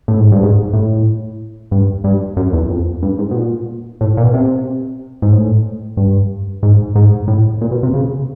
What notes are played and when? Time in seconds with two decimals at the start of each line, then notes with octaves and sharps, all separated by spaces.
0.08 A2
0.20 G#2
0.32 G2
0.43 G#2
0.73 A2
1.71 G2
2.04 G2
2.37 F#2
2.53 E2
2.70 F2
3.02 G2
3.19 G#2
3.31 B2
3.35 A#2
4.01 A2
4.17 A#2
4.23 B2
4.34 C3
5.22 G#2
5.32 A2
5.97 G2
6.63 G#2
6.95 G#2
7.28 A2
7.61 A#2
7.71 B2
7.83 C3
7.94 C#3